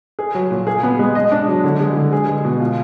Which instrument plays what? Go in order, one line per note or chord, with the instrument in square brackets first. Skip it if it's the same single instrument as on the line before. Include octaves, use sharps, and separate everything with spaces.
[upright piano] G#4
F#3
A#2
G#4
B3
G#3
D#5
D4
F#3
D3
G#3
D3
G#4
G#3
B2
F4